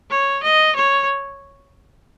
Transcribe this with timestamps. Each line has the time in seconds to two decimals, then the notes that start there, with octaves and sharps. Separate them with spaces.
0.11 C#5
0.43 D#5
0.76 C#5